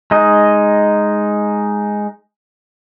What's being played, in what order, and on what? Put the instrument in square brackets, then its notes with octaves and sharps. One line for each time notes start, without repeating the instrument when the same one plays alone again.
[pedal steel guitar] G#3 D#4 D#5